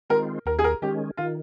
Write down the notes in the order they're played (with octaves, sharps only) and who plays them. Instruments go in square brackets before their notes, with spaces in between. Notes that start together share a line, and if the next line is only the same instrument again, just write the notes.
[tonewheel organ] D#3 G#3 C4 F4 [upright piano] A#4
[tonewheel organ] D#2 [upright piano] A#4
[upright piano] G#4
A#4
[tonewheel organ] D#3 G#3 C#4 [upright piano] G4
[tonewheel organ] D#3 [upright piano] F4